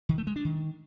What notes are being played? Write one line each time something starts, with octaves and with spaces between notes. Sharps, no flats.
D#3
A3
G#3
D4
D#3